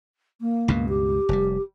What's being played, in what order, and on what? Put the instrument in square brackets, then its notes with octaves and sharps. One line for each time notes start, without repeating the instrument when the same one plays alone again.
[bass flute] A#3
[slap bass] C#2 G2 B2
[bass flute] G4
[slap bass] F1 G3